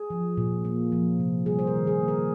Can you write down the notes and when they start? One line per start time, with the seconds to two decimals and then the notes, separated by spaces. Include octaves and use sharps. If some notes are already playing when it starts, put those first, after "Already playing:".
Already playing: G#4
0.10 F3
0.37 A#2
0.65 A#3
0.92 F3
1.20 C3
1.46 G3 G#4
1.59 C5
1.67 A#4
1.74 D#3
1.87 G#4
2.02 A#3
2.08 A#4